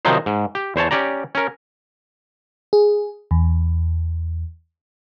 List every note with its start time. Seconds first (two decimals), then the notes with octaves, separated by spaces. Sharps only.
0.05 C3 D#3 F3 F#3 D#4 C5
0.26 G#2
0.55 G4
0.76 E2 C5 C#5 A5
0.91 C#4 G4 D5 A#5
1.35 C#4 A#4
2.73 G#4
3.31 E2